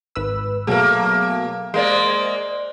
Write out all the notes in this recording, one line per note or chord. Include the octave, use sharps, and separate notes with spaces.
G#1 B4 E6
B2 F#3 A3 A#3 G#4
G#3 A#3 C5 D5